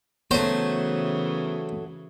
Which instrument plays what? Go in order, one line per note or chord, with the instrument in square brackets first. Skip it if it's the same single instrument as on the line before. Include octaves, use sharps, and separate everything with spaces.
[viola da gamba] C#3 E3 [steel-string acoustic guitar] F#3 A3 [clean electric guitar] B3 [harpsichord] C5